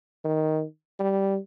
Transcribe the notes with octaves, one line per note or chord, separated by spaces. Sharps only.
D#3
G3